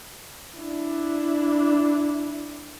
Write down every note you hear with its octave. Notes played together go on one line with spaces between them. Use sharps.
D4 E4